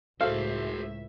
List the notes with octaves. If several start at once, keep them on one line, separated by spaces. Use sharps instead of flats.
C#2 A2 F#4 G#4 A4 C5 E5 F5